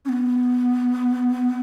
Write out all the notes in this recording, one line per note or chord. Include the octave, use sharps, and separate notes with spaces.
C#4
B3